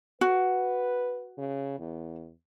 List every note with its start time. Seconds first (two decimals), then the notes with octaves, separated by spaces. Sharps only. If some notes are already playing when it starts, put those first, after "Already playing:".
0.21 F#4 B4
1.38 C#3
1.79 E2